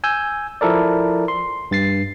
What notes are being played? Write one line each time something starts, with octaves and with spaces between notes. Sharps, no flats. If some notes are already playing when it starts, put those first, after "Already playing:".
G#5 E6 G6
F3 E4 A4 A#4 D5
C6
G2 A6 C7